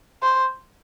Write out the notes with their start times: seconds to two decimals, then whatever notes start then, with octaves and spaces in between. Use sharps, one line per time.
0.23 C5